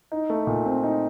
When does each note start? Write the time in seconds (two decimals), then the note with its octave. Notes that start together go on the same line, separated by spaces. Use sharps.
0.12 D#4
0.30 A3
0.47 A#2
0.66 C4
0.83 D#4